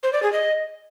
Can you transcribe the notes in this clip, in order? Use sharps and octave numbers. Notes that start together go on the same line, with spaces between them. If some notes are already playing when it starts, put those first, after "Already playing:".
C5
D5
G#4
D#5